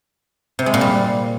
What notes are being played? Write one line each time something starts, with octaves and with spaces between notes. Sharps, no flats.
C3
G#3
A#2
G3